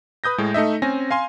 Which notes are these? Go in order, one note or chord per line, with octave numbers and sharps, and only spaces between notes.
B4 D#6 G6 A#6
A2 G#3
A3 D#4 D#5 E5
C4 C#4 G#5 A#6
F5 G#5 C6